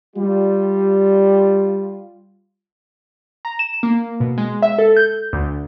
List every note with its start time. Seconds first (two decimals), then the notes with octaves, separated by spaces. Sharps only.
0.15 G3 F4
3.45 A#5
3.59 E7
3.83 A#3
4.20 B2
4.38 G#3
4.62 E5
4.78 A4
4.97 G6
5.33 D2